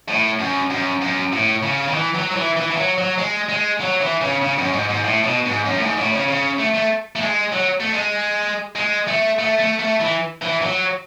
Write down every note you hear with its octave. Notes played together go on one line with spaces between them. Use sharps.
A2
F#2
F#2
F#2
A2
C#3
D#3
E3
F#3
F#3
E3
E3
E3
F#3
F#3
G#3
G#3
F#3
E3
C#3
C#3
F#2
G#2
G#2
A2
B2
G#2
F#2
A2
G#2
A2
C#3
C#3
A3
A3
A3
G#3
F#3
A3
G#3
G#3
A3
A3
A3
A3
E3
E3
F#3